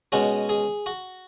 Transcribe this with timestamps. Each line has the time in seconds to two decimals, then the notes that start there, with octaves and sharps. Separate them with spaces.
0.12 B2 G#3 C#4 F#4
0.49 G#4
0.86 F#4